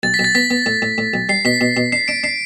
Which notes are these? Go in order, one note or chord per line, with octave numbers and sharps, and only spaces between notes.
B1 A6
B6
B1
A6
B3 B6
B3
A2
A2
A2
B1
G3 C7
B2 B6
B2
B2
D4 C7
D4 D7
D4 C7